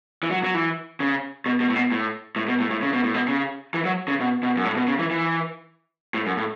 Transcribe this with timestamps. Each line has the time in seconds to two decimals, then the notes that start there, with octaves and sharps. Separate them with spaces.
0.23 E3
0.31 F#3
0.44 F#3
0.54 E3
1.00 C#3
1.46 B2
1.60 B2
1.69 A2
1.76 B2
1.92 A2
2.36 A2
2.48 B2
2.60 A2
2.71 A2
2.82 C#3
2.93 B2
3.04 A2
3.14 B2
3.28 C#3
3.74 E3
3.85 F#3
4.08 C#3
4.20 B2
4.43 B2
4.57 F#2
4.65 A2
4.76 B2
4.88 C#3
4.99 E3
5.11 E3
6.14 A2
6.26 F#2
6.37 A2